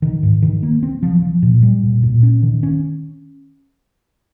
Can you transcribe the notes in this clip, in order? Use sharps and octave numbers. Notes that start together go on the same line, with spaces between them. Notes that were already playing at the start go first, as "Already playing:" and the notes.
D#3
G#2
D#3
A#3
C4
F3
F3
A#2
G3
A#2
A#2
C#4
D#3
C#4